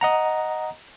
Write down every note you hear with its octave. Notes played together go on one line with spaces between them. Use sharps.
D#5 F#5 A#5